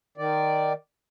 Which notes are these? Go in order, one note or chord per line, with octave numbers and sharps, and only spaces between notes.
D#3 D5